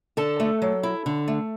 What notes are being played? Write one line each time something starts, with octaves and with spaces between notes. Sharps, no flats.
D3 A4 A5
A3
F#3
E4
D3
A3